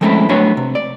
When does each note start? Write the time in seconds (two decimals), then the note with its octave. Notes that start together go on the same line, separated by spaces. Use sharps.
0.01 F3 G#3 A3 C4 C#4 E4
0.29 F#3 A3 B3 D4 F#4 C#5
0.57 C3
0.75 D5